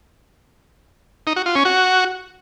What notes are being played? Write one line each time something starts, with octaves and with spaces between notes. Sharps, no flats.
D#4
F#4
F4
C#4
F#4